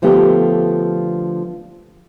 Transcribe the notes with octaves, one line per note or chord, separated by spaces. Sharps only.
D3 F3 A3 B3 G4